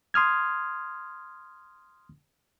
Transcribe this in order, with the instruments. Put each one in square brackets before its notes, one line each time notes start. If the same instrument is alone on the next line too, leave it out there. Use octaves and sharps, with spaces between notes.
[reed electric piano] C6 D#6 F6 G#6